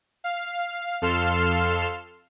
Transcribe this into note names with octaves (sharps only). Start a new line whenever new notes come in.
F5
F2 A4 F5 C6 F6 E7